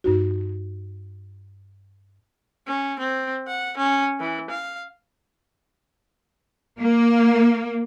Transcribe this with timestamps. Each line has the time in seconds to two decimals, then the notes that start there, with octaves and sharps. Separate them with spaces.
0.04 G2 D#4 F#4
2.67 C#4
2.99 C4
3.48 F#5
3.78 C#4
4.20 E3
4.50 F5
6.78 A#3